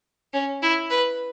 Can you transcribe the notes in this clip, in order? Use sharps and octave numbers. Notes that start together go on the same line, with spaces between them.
C#4
E4
B4